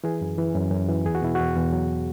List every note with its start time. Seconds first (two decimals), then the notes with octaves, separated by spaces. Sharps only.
0.04 E3 G#4
0.21 F#2
0.38 E3
0.55 F#2
0.71 F#2
0.89 E3
1.05 E2 G#4
1.15 F#4
1.22 B2 E4
1.35 E2 F#4
1.56 E2
1.73 F#3